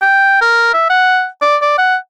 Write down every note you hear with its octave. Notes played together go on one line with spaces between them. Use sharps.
G5
A#4
E5
F#5
D5
D5
F#5